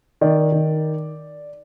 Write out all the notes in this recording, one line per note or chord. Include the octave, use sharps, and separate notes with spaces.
D#3 D5
D#3